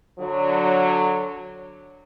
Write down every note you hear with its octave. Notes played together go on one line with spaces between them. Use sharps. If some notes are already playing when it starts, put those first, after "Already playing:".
D3 F#3